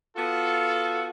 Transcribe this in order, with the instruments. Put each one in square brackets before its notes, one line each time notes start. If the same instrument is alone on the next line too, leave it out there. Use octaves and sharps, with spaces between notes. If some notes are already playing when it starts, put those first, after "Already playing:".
[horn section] B3 F4 F#4 A4